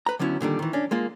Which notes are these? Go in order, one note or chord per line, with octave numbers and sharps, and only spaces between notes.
B4 A#5
D3 F#3 B3 C#4 E4
A#2 D3 D#3 G3
D#3 E3
C#4 D4
G#3 A#3 F4